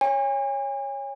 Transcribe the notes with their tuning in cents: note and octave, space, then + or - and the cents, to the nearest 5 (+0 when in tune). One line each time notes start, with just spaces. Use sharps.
C#5 +0 G#5 -35